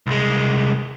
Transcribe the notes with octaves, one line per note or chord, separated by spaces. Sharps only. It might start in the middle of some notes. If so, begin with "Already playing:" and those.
C2 G#3